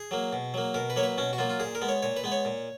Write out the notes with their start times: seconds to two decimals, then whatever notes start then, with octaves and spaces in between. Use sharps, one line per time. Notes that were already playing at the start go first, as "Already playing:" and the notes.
Already playing: G#4
0.11 F#3 A#3
0.33 B2
0.54 F#3 A#3
0.74 B2 A#4
0.90 B4
0.96 F#3 A#3 C#5
1.03 B4
1.18 B2 C#4
1.33 F#4
1.38 F#3 A#3 F4
1.50 F4
1.60 A#2 G#4
1.75 A#4
1.82 G#3 B3
1.89 C#5
2.03 A#2 C#5
2.17 B4
2.24 G#3 B3
2.32 C#5
2.45 A#2